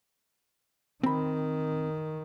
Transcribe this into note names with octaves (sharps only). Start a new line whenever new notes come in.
D#3 C4 B5